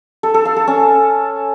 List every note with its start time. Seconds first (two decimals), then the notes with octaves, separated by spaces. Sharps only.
0.23 A4
0.34 A4
0.45 F5
0.56 A4
0.67 C#4